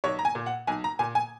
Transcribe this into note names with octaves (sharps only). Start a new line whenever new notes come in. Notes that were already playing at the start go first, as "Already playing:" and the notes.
B1 C#5
A#5
G#5
A#2
F#5
B1 G#5
A#5
A#2 G#5
G#5